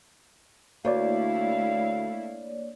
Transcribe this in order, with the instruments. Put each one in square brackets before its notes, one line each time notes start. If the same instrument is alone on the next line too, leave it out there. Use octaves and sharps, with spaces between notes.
[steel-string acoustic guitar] D2 [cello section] A3 E4 [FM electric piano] A#3 C#5 D5 [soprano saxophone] F5